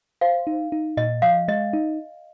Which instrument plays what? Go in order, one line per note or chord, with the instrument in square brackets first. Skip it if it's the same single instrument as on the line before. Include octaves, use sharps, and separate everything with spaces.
[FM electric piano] C5 [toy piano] F5
[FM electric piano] D#4
D#4
[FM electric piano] A#2 [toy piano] D#5
[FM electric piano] F3 [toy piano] F5
[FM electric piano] G#3 [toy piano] D#5
[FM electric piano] D#4